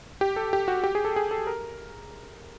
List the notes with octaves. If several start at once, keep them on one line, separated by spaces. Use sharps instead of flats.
G4
A4
G4
F#4
G4
G#4
A4
G#4
A4
A#4